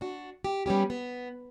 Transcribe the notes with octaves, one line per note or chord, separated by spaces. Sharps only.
D4 F#4
G4
G3 B3 C#4 G4
B3